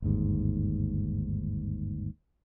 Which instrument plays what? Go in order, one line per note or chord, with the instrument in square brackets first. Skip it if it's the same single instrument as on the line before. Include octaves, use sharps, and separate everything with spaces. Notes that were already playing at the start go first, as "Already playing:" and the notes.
[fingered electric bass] G1 D#2 G#2